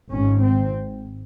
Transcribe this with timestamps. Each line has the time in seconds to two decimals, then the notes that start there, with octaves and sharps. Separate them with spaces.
0.11 G#1 G#2 C#4
0.42 C4